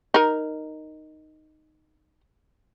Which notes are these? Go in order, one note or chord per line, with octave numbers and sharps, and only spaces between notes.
D#4 A#4